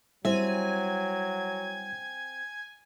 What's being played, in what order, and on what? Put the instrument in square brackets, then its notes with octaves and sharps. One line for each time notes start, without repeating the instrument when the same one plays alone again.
[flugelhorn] F#3 [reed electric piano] G3 E4 [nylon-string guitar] C4 E5 [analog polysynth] G#5